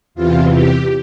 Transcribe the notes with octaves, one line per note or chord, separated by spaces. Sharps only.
E2 C3 E3 F4
G4